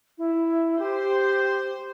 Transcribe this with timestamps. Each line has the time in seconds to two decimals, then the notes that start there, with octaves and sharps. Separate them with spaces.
0.18 E4
0.79 G4 C5